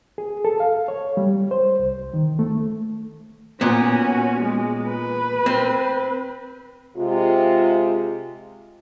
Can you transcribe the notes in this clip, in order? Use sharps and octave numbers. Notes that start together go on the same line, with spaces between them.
G#4
A4
F5
C#5
G3
C5
C2
D#3
A3
A#2 B3 C#4 F#4
G#3
B4
C4
C3 G#3 F4